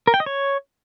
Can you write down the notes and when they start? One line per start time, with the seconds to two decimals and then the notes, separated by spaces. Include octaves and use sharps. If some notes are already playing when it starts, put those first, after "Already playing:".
0.07 A#4
0.14 G5
0.20 D#5
0.26 C#5